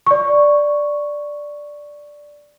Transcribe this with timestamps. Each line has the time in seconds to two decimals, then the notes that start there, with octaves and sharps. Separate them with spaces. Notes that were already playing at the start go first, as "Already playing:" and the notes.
0.07 D5 C#6